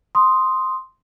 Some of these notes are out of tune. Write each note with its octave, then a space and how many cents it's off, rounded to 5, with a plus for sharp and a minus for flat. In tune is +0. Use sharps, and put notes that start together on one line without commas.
C6 +0 D#6 +0